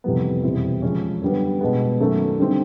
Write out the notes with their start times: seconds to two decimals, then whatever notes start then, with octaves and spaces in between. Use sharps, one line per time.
0.04 F2 C3 E3 G3 B3
0.43 E2 B2 G3 C4 E4
0.82 C#3 F3 G#3 C#4
1.22 F#2 D3 G3 B3
1.61 B2 G#3 B3
2.00 F#2 D#3 F#3 A3 C#4
2.39 D3 G3 C4 D#4